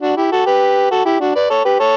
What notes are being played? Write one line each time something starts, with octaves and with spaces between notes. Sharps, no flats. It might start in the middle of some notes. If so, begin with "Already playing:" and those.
D4 F#4
E4 G4
F#4 A4
G4 B4
F#4 A4
E4 G4
D4 F#4
B4 D5
A4 C#5
G4 B4
A4 C#5